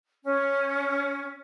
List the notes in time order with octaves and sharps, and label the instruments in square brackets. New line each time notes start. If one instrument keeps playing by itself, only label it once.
[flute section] C#4